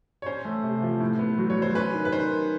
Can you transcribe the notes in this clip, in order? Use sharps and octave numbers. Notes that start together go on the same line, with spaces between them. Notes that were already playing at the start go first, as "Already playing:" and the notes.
C#5
C#4 C5
A3
C3
F3
A2
B3
F#3
C#5
F#3 C5
C#4 B4
D#3
B4
D#3 C5
D#3